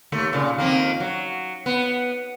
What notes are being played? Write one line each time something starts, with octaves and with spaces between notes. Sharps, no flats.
D#2 A3
A#2 C#3
F2 D#3 A#3
F#3
B3